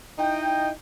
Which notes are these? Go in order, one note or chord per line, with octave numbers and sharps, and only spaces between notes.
D#4 E4 D#5 G5